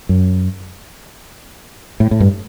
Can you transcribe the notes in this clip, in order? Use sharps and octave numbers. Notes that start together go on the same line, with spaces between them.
F#2
A2
A2
G2